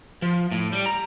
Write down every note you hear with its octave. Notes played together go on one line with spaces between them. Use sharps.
F3
A2
G3
A#5